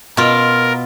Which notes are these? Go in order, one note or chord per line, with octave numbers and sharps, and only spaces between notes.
B2 F4 A#4